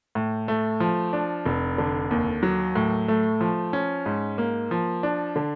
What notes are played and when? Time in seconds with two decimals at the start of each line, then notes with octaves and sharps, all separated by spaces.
0.15 A2
0.48 A3
0.80 F3
1.13 D4
1.46 F1
1.78 D3
2.11 D#2
2.43 F#3
2.76 A2
3.08 A3
3.41 F3
3.73 C#4
4.06 G#2
4.38 A#3
4.71 F3
5.03 D4
5.36 D3